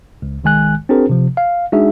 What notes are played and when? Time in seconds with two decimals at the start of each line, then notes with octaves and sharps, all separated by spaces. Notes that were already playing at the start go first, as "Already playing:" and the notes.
0.22 C#2
0.44 B1 D#3 G#3 G#5 F#6
0.89 C4 D4 F#4 G#4 A#4 C5
1.09 C3 F3
1.37 F5
1.72 G#3 D4 D#4 F#4 G#4 E5